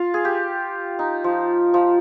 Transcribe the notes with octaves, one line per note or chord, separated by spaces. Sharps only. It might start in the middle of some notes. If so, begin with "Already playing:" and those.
Already playing: F4
G#4
G4
D#4
F3
F3